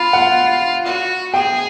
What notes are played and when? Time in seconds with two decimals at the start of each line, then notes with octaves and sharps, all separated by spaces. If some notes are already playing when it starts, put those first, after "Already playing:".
Already playing: F4 B5
0.13 F#5
0.86 F#4
1.33 G#4 G5